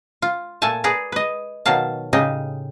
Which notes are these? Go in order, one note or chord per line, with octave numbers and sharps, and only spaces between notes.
F4
A#2 A3 A4 G#5 A5
G#4 B4 D5 A#5
B4 D#5
B2 D#3 F#3 F5 A5
A2 C#3 D#4 G4 D#5